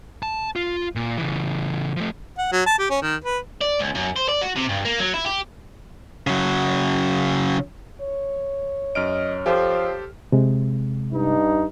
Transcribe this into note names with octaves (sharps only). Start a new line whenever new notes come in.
A5
F4
A#2
C#3 E3
F3 A3
F#5
F#3
A5
G4
C#4
D#3
B4
D5
C#2
F#2
C5
D5
F#4
C3
G2
A#3
F#3
E4
G4
C#3 F#3
C#5
F#2 D#5 F6 D7
F3 G4 A4 C5
C3 G#3
G2 D#4